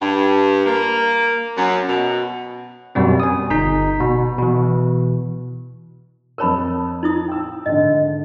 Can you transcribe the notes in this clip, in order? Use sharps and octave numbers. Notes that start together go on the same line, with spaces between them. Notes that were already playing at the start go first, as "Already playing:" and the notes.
G2
A#3
F#2
B2
F#2 B2 G3 C4
G#5 D#6
G1 D#4 A#5 G6 B6
B2
B2 E3
F2 A#4 C#5 A5 B5 E6
D#4 E4 D#6
G5 E6
G#1 D3 D#5